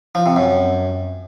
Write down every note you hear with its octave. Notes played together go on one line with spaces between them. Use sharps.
F3
C3
F#2